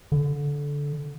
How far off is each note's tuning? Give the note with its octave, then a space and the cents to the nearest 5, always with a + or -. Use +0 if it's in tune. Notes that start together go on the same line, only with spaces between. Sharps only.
D3 -20